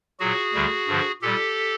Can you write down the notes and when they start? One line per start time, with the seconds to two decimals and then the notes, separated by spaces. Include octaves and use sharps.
0.19 A#2 F#3 F#4 G#4
0.54 D2 D3 G3
0.87 G2 D3 F3
1.22 A#2 G3 G4 A4